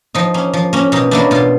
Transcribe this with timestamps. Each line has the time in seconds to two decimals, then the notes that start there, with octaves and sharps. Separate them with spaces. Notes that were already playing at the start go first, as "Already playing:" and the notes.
0.15 F3 D#4
0.34 A#3 C#4
0.53 F3
0.73 A#3 C#4
0.92 B2 D#4
1.11 F#3 A#3 D4 E4
1.31 B2 F4